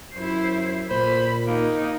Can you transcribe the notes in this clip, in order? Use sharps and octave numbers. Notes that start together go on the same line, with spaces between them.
F#2 E4 C5
A#2 C5 B5
A#3 D#4